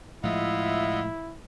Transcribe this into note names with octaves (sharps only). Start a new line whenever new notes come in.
A2 F3 G#3 E4 F4 D#5 E5 F#5